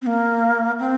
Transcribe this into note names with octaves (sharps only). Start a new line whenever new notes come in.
C4
A#3
C4